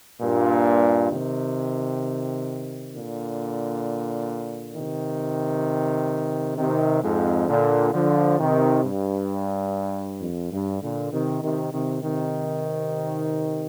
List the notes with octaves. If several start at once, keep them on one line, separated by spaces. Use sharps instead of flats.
G2 A#2
C3 D#3
A#2 D3
C3 D#3
C3 D#3
F2 G#2
A#2 D3
D3 F3
C3 D#3
G2
F2
G2
A#2 D3
C3 D#3
C3 D#3
C3 D#3
C3 D#3